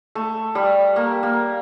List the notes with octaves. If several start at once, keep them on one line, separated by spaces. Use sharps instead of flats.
A3
G3
A#3
A#3